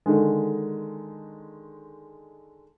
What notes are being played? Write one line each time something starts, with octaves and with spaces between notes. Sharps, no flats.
D3 D#3 G#3